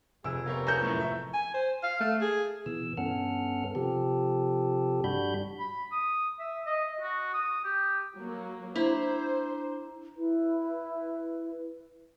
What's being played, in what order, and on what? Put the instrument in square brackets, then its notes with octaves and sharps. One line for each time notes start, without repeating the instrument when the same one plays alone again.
[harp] F1 D7 [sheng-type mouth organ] G#4 [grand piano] E6
[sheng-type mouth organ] B3 A#4 [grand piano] F4 G4 C#5
[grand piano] G#4 C#5 C#7 [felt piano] A#5 G6
[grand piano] F#2 A2 A3 [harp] C#6
[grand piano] E5
[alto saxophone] G#5
C5
F5
A3
G#4
[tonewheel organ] B2 E3 E6
G2 B3 C#4 A4 F#5 F6
C3 F3 G4 A4
G2 G3 D4 F#4 B5 G6
[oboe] B5
D#6
E5
D#5
F#4
D#6
G4
[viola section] F#3 A#3
[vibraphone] D4 A#5 [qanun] E4 B5 [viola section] C5
[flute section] E4 B4